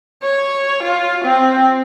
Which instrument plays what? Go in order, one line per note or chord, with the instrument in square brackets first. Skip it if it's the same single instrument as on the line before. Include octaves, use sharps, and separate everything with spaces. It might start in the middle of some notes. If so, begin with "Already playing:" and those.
[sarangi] C#5
F4
C4